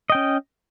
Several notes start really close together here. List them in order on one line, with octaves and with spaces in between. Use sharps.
D#5 G5 C#4